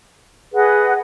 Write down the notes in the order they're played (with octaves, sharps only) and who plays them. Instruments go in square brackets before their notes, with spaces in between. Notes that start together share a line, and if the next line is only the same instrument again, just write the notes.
[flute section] G#4 B4 D#5 F#5